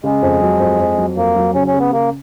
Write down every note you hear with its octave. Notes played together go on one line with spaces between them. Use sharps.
C#3 G#3
F2
F#3
F2
F2
F#3
F2 A#3
F#3
C#3 C#4
C#4
C#3
B3
C#3 A#3